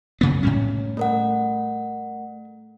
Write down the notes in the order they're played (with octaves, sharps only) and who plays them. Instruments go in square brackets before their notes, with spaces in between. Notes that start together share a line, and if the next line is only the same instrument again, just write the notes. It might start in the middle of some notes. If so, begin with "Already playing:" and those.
[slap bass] F#2 C#3 B3
A2 G3 C#4
[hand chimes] A3 A#4 F#5